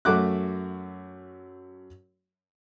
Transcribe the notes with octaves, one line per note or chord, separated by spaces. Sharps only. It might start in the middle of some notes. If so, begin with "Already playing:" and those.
F#2 A3 F#4 D6 F#6